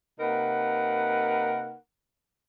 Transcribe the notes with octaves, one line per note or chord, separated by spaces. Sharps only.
C3 A#3 D#4 A#4 B4 F#5